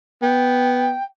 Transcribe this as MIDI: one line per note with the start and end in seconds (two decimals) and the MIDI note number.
0.22 0.95 59
0.22 1.03 79